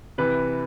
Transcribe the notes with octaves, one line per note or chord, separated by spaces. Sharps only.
C3 E3 B4